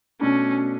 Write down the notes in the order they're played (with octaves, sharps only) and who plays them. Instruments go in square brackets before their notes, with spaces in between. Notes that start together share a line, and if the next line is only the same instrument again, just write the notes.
[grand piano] B2 A3 D4 [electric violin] C#4